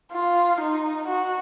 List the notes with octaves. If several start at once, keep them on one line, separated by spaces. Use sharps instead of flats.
F4
D#4
F#4